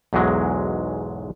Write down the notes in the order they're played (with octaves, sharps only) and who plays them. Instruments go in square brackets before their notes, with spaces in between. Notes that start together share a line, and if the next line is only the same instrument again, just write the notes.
[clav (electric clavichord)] B1 E2 G#2 F#3 G#3